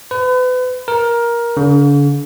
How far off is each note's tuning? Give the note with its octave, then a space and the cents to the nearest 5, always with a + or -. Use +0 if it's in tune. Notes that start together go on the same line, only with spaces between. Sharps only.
B4 +35
A#4 +15
D3 -45